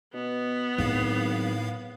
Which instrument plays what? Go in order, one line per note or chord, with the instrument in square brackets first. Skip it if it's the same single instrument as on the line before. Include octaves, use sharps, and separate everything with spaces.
[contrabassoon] B2 [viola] B3
[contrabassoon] G#1 [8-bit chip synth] A2 F5 [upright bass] F#3